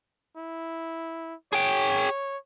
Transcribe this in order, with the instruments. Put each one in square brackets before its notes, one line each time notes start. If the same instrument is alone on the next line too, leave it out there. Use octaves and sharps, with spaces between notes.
[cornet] E4
[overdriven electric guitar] G#4 G5 [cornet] C#5